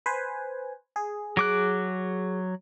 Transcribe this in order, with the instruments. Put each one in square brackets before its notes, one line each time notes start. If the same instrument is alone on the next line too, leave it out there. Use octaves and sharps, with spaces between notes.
[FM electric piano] B4 C5 G#5
G#4
[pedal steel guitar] F#3 D6 F#6